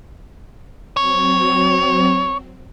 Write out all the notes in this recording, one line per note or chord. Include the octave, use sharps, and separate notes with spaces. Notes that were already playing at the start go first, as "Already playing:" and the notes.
F#3 C4 C#5